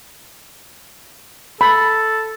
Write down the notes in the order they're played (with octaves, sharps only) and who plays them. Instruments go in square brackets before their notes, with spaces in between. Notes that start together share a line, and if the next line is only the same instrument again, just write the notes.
[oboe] A4 [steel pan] B5